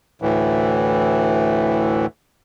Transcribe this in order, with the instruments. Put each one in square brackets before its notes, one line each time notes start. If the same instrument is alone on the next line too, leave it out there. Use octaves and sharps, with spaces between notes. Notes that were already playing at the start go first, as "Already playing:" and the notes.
[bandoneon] D2 A2 E3